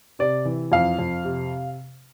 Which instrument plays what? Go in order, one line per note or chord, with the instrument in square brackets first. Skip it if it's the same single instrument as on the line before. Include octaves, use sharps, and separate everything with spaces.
[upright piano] C3 D5
E3
F2 F5
F2
C3